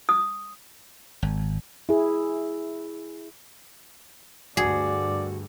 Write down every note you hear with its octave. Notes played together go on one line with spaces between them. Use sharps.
D#6
G#1
E4 G#4
D2 G2 D3 F#4 G#4 D5